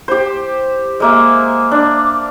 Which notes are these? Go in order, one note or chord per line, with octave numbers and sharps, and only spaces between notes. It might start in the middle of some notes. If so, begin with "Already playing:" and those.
G4 C5
G#3 A#3 E5
D4